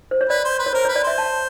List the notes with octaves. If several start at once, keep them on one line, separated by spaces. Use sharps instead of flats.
C5
C#5
B4 D5
C5
B4
C#5
A#4 C5
B4 C#5
D5
C5 E5
A5